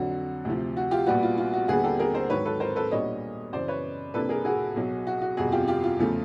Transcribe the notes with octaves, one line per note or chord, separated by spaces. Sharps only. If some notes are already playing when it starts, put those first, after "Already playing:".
Already playing: F2 D3 F#3 F#4
D2 C3 F3
F#4
F4 G4
A#1 A#2 G3 B3 F#4
F4
F4
F#4
D#2 D3 G3 B3 F#4 G#4
G4 A4
G#4 A#4
A#4 C5
G#2 D#3 F#3 B4 C#5
A4 B4
A#4 C5
A4 B4
B1 A#2 G3 B3 D4 C#5 D#5
F#2 C#3 E3 C5 D5
B4 C#5
C2 C3 F3 A#3 D4 A4 B4
G#4 A#4
F#4 G#4
B1 B2 F#3
F#4
F#4
G1 F2 C3 F#4 G#4
F4 G4
F4 G4
F4
E2 C#3 F3 A3